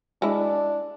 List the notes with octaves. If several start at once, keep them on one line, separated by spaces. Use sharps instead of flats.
G#3 D4 E4